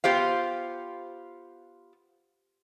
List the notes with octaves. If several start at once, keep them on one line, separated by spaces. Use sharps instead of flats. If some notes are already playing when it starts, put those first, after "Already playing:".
B3 F4 G4 C5 F5